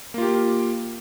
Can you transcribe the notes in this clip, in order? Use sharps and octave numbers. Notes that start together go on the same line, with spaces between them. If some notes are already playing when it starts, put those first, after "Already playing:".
A#3 F4 G4